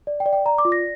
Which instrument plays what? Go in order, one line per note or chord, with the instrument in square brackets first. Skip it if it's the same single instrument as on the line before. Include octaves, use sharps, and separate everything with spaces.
[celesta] D5
G5
D5
G5
D5 A#5
D6
F4
A#6